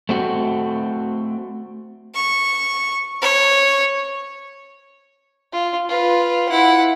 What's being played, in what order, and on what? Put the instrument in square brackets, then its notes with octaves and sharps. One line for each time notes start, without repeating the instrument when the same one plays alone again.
[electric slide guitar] A3 C4 F#4
[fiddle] C#6
C#5
[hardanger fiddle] F4
F4 B4
E4 F#5